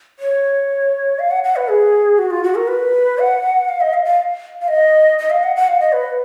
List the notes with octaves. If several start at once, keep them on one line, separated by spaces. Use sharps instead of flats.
C#5
F5
F#5
F#5
B4
G#4
F#4
F4
F#4
A#4
B4
F#5
F5
D#5
F5
F5
F5
D#5
D#5
F5
F#5
F#5
F5
D#5
B4